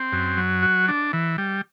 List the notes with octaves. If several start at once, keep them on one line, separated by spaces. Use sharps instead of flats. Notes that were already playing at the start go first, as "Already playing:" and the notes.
Already playing: C4
F#2
F#3
F#4
D4
E3
G3